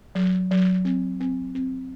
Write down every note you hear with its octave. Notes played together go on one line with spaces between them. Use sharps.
F#3
F#3
C4
C4
C4